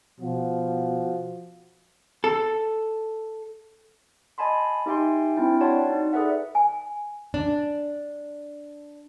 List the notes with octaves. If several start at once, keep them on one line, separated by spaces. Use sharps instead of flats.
B2 F3 F#4
A4
D#5 G#5 A5 B5 C6
D#4 G4 E5 G5 G#5 C6
C4 D4 E4 G5
F#4 C#5 D5 F#5 A5 C6
D#4
G#4 A4 B4 D5 E5 F#5
G#5
D4